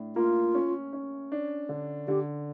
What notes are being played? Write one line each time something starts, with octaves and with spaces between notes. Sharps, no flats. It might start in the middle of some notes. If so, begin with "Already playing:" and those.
Already playing: A2 D4
A#3 F4
C#4
C#4
D4
D3
D3 G4